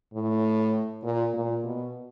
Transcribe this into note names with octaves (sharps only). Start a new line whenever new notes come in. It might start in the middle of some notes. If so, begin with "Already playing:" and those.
A2
A#2
A#2
B2